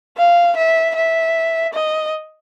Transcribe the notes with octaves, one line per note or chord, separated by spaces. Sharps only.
F5
E5
E5
D#5